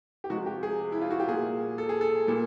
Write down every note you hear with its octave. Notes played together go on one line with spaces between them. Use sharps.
G4
C3 F3 G#3 F#4
G4
G#4
E4
F4
F#4
G4
A#2 G3 G#4
A4
G#4
A4
A#2 G3